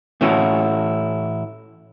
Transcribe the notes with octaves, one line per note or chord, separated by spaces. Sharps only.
A2 E3 A3 C#4 E4 F#4